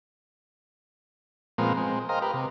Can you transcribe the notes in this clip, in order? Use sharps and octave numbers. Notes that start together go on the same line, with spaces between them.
A#2 F3 G#3 B3 C4 A#4
G#3 C4
A#4 C5 D#5 F5 G5 A#5
G4 A#4 B4
C3